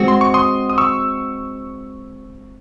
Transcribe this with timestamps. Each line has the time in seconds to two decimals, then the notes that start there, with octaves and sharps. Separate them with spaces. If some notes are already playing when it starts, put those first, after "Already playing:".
Already playing: G#3 C4 F#4
0.08 C6
0.21 C#6
0.34 C6 D#6
0.70 D#6
0.78 C#6 E6